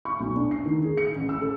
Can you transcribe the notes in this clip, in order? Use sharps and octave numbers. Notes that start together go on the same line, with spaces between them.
C#6
B1
D4
C7
D#3
G#4
C#7
A1
E6
A4